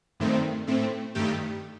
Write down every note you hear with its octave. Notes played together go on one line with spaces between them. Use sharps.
G2 D#3 A3 C4
A2 A3 C4
G2 D#3 A3 G4